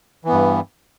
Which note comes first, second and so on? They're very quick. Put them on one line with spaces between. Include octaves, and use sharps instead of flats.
E3 B3 G2